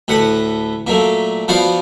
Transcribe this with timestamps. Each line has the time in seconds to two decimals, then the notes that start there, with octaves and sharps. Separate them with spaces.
0.08 D2 A2 B4 F#5
0.87 A#2 F#3 A3
1.48 F3 B3 F#4 D5 F5